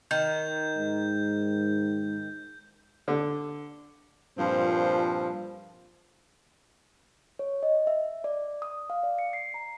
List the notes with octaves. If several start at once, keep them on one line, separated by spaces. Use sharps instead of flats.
D#3 G6
G#2
D3
G2 A#2 F3 C4
C#5
D#5
E5
D5
D#6
F5
D5
C#7
C7
A#5